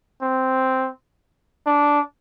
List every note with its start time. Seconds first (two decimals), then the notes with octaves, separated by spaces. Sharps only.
0.21 C4
1.66 D4